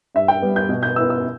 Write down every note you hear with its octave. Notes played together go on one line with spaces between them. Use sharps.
G2 E5
G5
G3 B3
G6
B2
G6
B3 E4 E6
E6